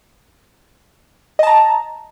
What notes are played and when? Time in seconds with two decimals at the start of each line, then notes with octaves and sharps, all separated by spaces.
1.39 D#5
1.43 A5
1.47 A#5